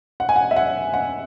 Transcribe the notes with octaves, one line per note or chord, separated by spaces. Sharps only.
F#5
G#5
F#5
E5
F#5
F#5